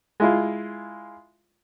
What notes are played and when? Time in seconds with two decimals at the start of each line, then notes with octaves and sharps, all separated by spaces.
0.20 G#3 E4 F4